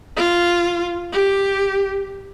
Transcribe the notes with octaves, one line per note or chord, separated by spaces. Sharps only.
F4
G4